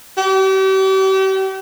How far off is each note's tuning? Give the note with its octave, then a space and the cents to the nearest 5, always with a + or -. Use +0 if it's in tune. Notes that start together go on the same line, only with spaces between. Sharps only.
G4 -40